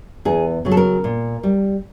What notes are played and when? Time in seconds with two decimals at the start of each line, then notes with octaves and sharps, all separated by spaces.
0.25 E2 G#4
0.65 C#3 F#3
0.71 A4
0.77 A#4
1.04 A#2
1.43 G3